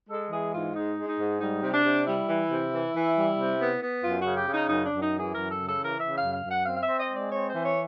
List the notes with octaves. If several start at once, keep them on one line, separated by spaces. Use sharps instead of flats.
G#3 A4
E3 G#4
G#2 F4
G#3 D#4
G#3
D#4
G#2
G3 D#4
C3
D4
C3
G3 E4
E3
C3
E3
E3
G3
C3
B3
B3
F#2 F4
F#4
C#3
G4
C#3
D#4
F#2 D#4
D4
F#2
D#4
E3
G#4
F#2 A#4
A4
C#3
A4
E3
A#4
C#3 E5
F5
F#2
F5
F#2
F#5
C4 F5
F5
E5
C4
D#5
G#3
D5
C4 C#5
C5
E3
C#5